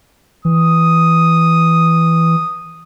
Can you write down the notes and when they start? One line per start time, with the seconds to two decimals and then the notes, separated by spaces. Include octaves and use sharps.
0.45 E3 D#6